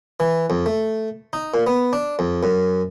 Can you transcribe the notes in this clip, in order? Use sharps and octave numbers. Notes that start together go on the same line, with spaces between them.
E3
F2
A3
D#4
A#2
B3
D4
F2
F#2